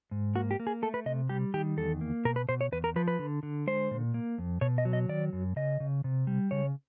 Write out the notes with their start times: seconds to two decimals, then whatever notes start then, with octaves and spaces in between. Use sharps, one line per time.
0.11 G#2
0.35 A#3 F#4
0.51 G4
0.60 A#3
0.67 G#4
0.82 A3 A4
0.94 B4
1.06 C3 D#5
1.29 G3 G4
1.54 D#3 G4
1.77 E2 A4
2.01 A#3
2.25 B2 A#4
2.36 B4
2.49 B2 C5
2.61 C#5
2.72 E2 B4
2.84 A#4
2.96 F3 B4
3.08 B4
3.19 D3
3.43 D3
3.67 G#3 C5
3.91 A#2
4.14 A#3
4.38 F2
4.61 B2 C#5
4.78 D#5
4.85 F#3
4.93 D#5
5.09 D#3 D5
5.33 F#2
5.56 C#3 D#5
5.80 C#3
6.04 C3
6.27 G3
6.51 C#3 C#5